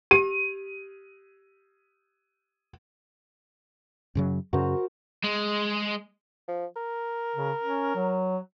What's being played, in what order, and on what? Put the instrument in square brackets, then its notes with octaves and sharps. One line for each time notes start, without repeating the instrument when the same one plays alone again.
[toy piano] G4 [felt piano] D#7
[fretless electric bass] F#2 C#3 F#3
[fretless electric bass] F#2 C#3 [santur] F#4 A#4 C5
[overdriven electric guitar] G#3
[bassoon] F3
A#4
[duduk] C#3
C#4
F#3